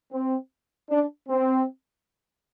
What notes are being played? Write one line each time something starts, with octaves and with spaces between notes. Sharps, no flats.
C4
D4
C4